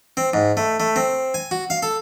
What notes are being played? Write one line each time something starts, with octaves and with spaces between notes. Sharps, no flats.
C4
G#2
A3
A3
C4
G#5
F#4
F5
A4